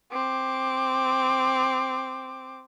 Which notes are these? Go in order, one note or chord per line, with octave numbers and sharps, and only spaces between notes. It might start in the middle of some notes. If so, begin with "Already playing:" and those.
C4 D6